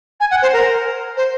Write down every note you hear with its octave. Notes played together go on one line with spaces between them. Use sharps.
G#5
F#5
C5
A#4
C5